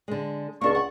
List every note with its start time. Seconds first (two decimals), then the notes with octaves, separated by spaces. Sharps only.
0.08 D3 G#3
0.61 C#2 A#3 D4 D5 C#6
0.75 F#5